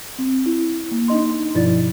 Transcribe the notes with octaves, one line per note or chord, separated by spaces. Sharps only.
C4
E4
A#3
D4 D#4 D#5 C6
G2 B2 F3 E4 D5 A6